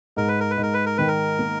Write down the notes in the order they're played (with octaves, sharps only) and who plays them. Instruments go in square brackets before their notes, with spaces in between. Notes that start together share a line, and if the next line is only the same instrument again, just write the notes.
[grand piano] G#2 [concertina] A#4
[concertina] B4
A#4
B4
[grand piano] G#2 [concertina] A#4
[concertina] B4
A#4
[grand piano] D#3 [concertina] B4
[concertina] A#4
[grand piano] A#3